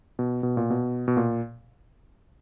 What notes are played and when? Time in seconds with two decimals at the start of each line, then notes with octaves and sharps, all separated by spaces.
0.19 B2
0.43 B2
0.57 A#2
0.70 B2
1.08 B2
1.17 A#2